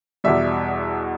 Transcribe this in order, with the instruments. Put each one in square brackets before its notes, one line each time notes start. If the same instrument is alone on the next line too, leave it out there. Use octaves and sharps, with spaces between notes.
[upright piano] E2 B2 G3 E5